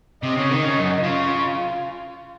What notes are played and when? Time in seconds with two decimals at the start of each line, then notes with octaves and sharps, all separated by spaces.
0.23 C3 D#5
0.37 C#3
0.50 D#3
0.63 C#3
0.77 F#2
1.03 C#3 F4